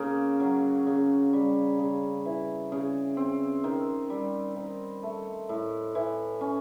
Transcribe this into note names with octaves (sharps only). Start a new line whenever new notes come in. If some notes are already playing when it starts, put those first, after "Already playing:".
Already playing: C#3 A#3
F#3
C#3
G3
C#3
E3
C#3
C4
D#3
G3
D#3
A3
A2
E3
C#4